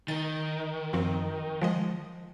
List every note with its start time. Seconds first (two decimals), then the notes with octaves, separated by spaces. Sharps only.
0.08 D#3 A6
0.93 F#2 F3 C4
1.62 F3 G#3 D#5